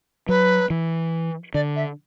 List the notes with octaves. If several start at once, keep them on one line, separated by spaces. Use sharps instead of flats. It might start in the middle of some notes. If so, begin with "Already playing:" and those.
F#3 B4
E3
D3 D5
E5